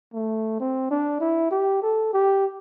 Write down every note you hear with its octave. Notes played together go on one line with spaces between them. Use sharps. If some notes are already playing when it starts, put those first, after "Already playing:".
A3
C4
D4
E4
G4
A4
G4